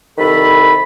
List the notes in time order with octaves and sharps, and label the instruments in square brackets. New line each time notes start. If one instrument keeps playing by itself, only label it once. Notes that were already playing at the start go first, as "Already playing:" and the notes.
[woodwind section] C2 D#3 A4 B5